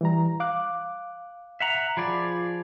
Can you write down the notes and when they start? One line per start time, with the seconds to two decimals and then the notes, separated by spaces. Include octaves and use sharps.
0.01 E3 G3 A#5
0.40 F5 D6 F#6
1.60 E5 F#5 A#5
1.97 F3 G#4 D5 B5